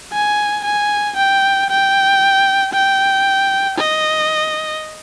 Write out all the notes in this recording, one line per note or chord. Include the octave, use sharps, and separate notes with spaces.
G#5
G#5
G5
G5
G5
D#5